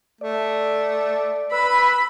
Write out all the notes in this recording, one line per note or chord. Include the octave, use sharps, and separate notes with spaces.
A3 D5
B4 B5 E6